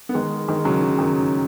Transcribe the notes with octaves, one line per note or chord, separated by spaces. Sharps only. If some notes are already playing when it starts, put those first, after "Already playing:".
B3
D#3 G#3
D#3 G#3
C#3 F#3
C#3
D#3